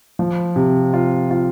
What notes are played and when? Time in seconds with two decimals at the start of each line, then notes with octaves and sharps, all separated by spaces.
0.19 F3
0.56 C3
0.94 F4
1.31 F4